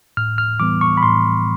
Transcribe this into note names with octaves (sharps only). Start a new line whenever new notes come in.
A2 F6
F6
E3 G3 B3 D6
C#6
B5
A2 C6